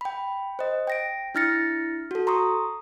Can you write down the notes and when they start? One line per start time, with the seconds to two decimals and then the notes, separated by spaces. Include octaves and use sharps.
0.01 G5 B5
0.59 C5 D#5
0.87 G5 A#6 D7
1.35 D4 E4 F6 A6 A#6 C#7
2.11 F#4 A4
2.27 A#5 C6 C#6 D#6